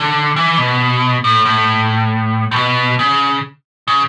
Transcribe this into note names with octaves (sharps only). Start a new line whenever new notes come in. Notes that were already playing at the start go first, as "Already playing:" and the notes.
Already playing: D3
E3
B2
A2
A2
A2
B2
C#3
C#3